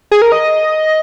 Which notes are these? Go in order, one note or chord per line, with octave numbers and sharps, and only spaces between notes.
G#4
A#4
D#5